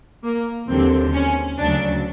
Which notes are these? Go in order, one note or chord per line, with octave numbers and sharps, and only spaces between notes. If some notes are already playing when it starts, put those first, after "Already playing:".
A#3
D#2 D3 F#3 C4
C#4
D2 C#3 F#3 D4